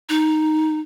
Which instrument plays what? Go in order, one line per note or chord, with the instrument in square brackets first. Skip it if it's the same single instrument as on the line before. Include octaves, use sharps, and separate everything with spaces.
[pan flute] D#4